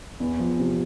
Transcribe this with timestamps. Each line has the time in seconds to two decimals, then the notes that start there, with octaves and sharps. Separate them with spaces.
0.20 E2
0.39 F3
0.59 C3